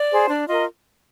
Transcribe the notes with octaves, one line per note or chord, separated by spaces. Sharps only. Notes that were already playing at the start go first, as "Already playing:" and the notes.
Already playing: D5
G#4 C5
D4 D5
F4 A#4 D#5